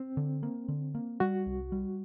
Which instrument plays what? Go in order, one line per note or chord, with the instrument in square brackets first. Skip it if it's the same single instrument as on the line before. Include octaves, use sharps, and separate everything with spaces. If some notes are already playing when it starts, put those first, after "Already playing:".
Already playing: [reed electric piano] C4
[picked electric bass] D3
A#3
D3
A#3
[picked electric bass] G3 [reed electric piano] F#4
[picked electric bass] C2
G3